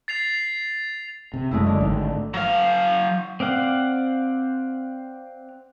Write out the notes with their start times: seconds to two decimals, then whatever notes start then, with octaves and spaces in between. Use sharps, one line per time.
0.08 A6 C7 F7
1.34 C3
1.51 F#1 F#2 G#3 A3 E4
1.66 D3
1.81 G#1
2.34 F#3 F5
3.40 C4 D5 F5 F#5